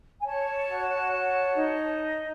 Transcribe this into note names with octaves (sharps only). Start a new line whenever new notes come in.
G#5
C#5 A5
F#4
C#5
D#4